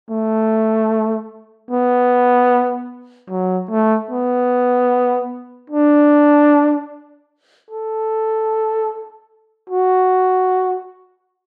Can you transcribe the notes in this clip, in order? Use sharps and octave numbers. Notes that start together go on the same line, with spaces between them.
A3
B3
F#3
A3
B3
D4
A4
F#4